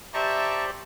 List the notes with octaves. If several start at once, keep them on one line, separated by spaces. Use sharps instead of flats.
G4 C5 D5 E5 A5 A#5 C#6